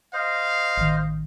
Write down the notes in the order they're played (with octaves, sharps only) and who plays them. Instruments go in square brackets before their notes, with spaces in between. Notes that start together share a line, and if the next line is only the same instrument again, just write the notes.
[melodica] C5 D#5 [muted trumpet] F5
[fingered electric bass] A1 D#3